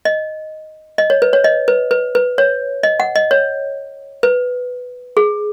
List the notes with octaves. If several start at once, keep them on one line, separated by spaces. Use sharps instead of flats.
D#5
D#5
C#5
B4
C#5
D#5
B4
B4
B4
C#5
D#5
F#5
D#5
C#5
B4
G#4